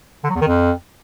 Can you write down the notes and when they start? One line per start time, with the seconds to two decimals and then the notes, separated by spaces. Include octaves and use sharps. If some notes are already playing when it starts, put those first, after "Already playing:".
0.24 D3
0.30 F#3
0.35 E2
0.41 D#3
0.47 F2